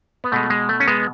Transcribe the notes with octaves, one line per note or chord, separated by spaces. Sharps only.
B3
B2 G#3 A3
G#3
A3
C#4
G#3 B3